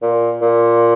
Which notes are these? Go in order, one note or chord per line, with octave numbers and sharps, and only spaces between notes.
A#2
A#2